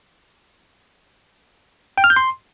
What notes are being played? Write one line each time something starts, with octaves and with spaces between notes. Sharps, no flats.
G5
F6
G6
C6